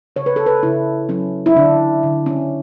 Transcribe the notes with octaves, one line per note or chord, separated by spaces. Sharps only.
C#3 C#5
B4
A4
B4
C#3 E4
F#3 C#4
E4
D3 D4
D3
C#4